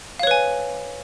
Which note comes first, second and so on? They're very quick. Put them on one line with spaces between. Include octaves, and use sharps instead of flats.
F5 C#5 B4 G#5